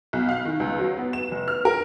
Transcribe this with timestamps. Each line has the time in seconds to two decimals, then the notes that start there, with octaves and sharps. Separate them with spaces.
0.13 B1
0.29 F5
0.45 D#3
0.60 C#2
0.79 F#3
0.98 B3
1.13 E7
1.31 F1
1.48 F6
1.65 A#4